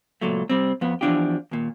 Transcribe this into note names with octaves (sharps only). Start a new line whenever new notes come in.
C#2 A#2 F#3 A3
C3 G3 C4
F2 B3
E2 F3 D4 F4 G4
D#2 A#2